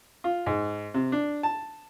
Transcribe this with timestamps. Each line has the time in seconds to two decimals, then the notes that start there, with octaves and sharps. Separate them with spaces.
0.24 F4
0.46 G#2
0.94 C3
1.12 D4
1.43 A5